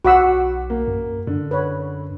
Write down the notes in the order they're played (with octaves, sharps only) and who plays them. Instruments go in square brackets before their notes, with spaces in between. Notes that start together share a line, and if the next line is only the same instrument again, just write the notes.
[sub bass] B1 [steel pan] F#4 F#5 E6 [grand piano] C#6 D6 B6
[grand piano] A#3
[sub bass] F#2
[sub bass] F#2 [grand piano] D3
[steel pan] B4 C#5